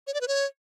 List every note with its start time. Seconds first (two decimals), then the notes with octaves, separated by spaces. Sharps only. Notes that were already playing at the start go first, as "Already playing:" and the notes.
0.07 C#5
0.14 D5
0.21 B4
0.28 C#5